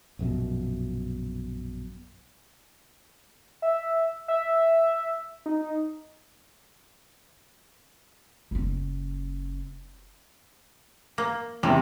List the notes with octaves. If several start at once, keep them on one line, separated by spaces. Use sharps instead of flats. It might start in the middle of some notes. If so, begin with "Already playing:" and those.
A#1 F#2 B2
E5
E5
D#4
F#1 C#4
A#3
E2 C3 E3 G3 C#4